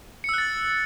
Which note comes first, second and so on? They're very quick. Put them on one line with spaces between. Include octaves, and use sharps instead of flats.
C#7 E6 F#6 A6